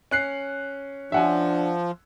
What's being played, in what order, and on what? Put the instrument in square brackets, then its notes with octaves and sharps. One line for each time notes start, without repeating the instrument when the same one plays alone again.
[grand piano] C#4 F#6 C7
[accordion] F3 [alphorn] D4 [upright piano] E5 F#5 G#5